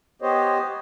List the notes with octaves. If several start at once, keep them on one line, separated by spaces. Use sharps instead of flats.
B3 G4 C5 C#5 D#5